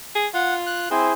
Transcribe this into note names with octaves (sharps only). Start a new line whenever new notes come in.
G#4
F4 F#5
F#6
C4 E4 G#4 C5